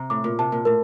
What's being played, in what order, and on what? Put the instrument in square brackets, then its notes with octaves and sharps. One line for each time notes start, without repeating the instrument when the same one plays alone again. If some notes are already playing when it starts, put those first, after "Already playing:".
Already playing: [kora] C3 [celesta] A#5
[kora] A2 [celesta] D6
[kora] A#2
[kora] C3 [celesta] A5
[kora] A#2
[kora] A2 [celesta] A#4